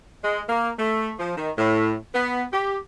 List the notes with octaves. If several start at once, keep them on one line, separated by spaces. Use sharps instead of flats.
G#3
A#3
A3
F3
D#3
A2
B3
G4